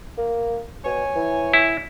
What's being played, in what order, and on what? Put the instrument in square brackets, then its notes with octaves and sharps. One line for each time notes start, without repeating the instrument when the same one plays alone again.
[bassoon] A#3
[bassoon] B2 [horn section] C#5 G#5
[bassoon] E3
[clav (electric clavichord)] E4